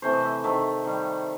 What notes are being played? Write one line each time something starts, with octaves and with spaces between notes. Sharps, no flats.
C3 E3 A3 C5
D#5
E5
C3 D#3 A3 E5
D#3 G3